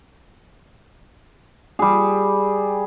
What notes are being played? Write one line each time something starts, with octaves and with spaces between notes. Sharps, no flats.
G3 G#4